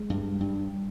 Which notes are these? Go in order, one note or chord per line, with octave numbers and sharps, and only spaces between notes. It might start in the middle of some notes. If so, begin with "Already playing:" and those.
Already playing: G#3
G2
G2